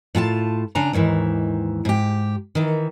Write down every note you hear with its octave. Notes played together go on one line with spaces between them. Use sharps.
A2 F4 G#5 A5
C#3 D4 G#5 A#5
D#2 G#2 D#3 E3
G#2 G4
D#3 E3